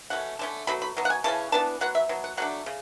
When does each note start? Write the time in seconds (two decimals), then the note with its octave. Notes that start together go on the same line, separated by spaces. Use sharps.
0.10 B2 A3 C#4 F#5
0.39 D3 A3 C#4 A5
0.67 B2 F#3 A3 B5
0.82 B5
0.97 B2 F#3
1.05 F#5
1.10 G#5
1.24 C#3 E3 C#4 A5
1.52 E3 B3 D4 A5
1.81 F#3 B3 F#5
1.95 E5
2.09 B2 F#3
2.24 F#5
2.37 F#3 A3 D4 F#5
2.66 C#3